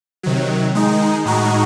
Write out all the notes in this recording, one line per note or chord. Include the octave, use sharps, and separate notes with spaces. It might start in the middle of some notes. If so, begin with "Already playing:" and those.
C3 D#3 F#3
D#3 G#3 D#4
A2 G#3 D#4 F#4